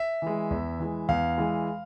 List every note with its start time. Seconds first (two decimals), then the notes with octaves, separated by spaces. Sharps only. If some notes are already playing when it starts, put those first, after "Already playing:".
Already playing: E5
0.22 E3 G#3
0.50 E2
0.79 E3 G#3
1.09 E2 F5
1.38 E3 G#3